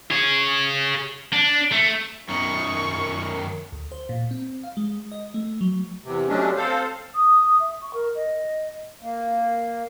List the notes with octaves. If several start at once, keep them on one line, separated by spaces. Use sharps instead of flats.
G#4 C#5
D4
A3
F#2 D#3 C#6
D2
C5
A#2
C4
F5
G#3
D#5
A3
F#3
E2 C3
C3 F#3 G#3 A3 C#4 D4
C4 A4 C5 F5
D#6
E5
C#6
A#4
D#5
A#3